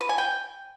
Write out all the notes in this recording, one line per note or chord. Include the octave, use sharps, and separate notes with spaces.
B4
G#5
G5